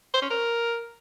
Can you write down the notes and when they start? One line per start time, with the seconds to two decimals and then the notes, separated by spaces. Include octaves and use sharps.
0.14 C5
0.22 C#4
0.30 A#4